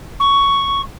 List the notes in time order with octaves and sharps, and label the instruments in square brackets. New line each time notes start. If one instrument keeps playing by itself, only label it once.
[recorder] C#6